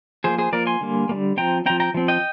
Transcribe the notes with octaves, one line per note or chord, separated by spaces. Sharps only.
F3 A#3 G#4 C5
G#4 C5
F3 A#3 A#4 D5
G#5 C6
D3 G3 A#3
D3 G3 A#3
F3 C4 G5 A#5
F3 C4 G5 A#5
G5 A#5
F3 C4
D#5 G5